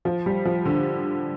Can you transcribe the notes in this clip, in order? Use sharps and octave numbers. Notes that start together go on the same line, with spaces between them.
F3
G3
F3
D3